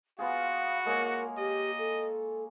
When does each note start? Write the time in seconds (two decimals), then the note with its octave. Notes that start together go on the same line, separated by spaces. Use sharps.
0.19 B3 F4 F#4 G#4 F5
0.86 G#3 A#3 A#4 C#5
1.38 G4 D#5
1.79 A4